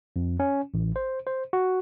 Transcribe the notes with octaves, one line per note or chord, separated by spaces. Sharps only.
F2
C#4
A1
C5
C5
F#4